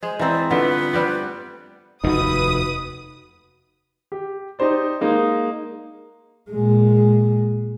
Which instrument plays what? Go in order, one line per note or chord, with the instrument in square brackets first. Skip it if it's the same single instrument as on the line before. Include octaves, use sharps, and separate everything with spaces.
[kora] G#3 G#4 [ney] C5
[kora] E3 C4 [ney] D5 [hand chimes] D#5 A#5 E6
[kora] D3 G3 A3 [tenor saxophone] B3 [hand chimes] F4 [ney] B4
[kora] G3 C4 D5
[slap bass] F1 D#2 [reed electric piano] D#4 F#4 [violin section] B4 D#6
[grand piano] G4
D#4 G4 C5 D5
G#3 A#3 D#4
[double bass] A#2 G#3